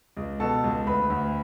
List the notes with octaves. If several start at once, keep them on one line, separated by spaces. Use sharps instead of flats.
C#2
B2 A4 A5
C#2
D2 B4 B5
D2